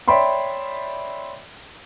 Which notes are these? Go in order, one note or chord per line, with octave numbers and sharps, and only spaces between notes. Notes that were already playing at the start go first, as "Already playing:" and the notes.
C#5 D5 E5 G5 B5 C6